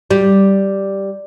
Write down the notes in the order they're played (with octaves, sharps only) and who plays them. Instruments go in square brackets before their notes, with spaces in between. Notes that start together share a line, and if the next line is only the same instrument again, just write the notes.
[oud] G3